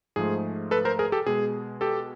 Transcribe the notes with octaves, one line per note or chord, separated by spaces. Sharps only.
G#2 F3 A3 G#4
A4 B4
A#4 C5
G#4 A#4
G4 A4
B2 G#3 G#4
G4 A4